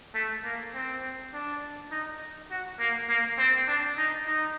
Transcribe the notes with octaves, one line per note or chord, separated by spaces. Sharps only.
A3
A#3
C4
D4
D#4
F#4
A#3
A#3
C4
D4
D#4
D#4